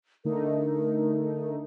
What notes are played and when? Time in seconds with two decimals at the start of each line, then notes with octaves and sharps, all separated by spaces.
0.25 D3 A3 D#4 A#4